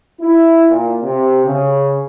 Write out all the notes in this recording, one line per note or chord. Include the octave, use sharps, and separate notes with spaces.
E4
A#2
C3
C#3